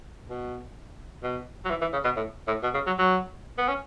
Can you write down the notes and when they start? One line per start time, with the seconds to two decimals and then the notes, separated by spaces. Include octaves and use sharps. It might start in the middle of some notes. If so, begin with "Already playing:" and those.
0.29 B2
1.23 B2
1.65 F#3
1.70 E3
1.81 E3
1.93 C#3
2.04 B2
2.16 A2
2.48 A2
2.63 B2
2.74 C#3
2.86 F#3
2.98 F#3
3.58 B3
3.68 C#4